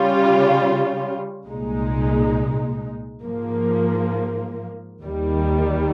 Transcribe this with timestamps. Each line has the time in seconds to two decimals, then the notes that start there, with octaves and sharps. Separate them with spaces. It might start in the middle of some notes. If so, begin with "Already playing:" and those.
Already playing: C#3 G3 C#4 F4
1.47 C2 A#2 G#3 D#4
3.24 G#2 F3 A#3
5.01 D#2 D#3 G3